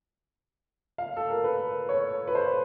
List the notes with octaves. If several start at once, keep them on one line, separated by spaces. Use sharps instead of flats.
F5
A4
A#4
B4
C#5
B4
C5